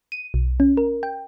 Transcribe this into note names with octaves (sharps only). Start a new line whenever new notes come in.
D#7
B1
C#4
A#4
G5